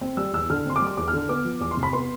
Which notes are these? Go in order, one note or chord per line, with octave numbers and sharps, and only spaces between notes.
C4
G3 E6
E2 E6
D3 F6
C4 C6
D6
G3
D6
E2 D6
F6
D3
B3 D6
F3
E2 D6
C6
C3
B5
B3 C6